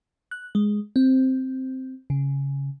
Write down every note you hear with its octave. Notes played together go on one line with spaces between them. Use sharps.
F#6
G#3
C4
C#3